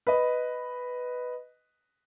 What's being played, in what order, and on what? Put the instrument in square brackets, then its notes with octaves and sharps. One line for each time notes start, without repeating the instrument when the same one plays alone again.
[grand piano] B4 D#5